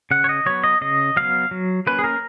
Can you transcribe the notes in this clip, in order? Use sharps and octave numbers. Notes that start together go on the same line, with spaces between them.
C#3 F#5
C#5
D#5
F#3 B3 C#5
D#5
C#3 D#5
F#3 B3 F5
F#3
A#3 C#4 B4
G#4
A#4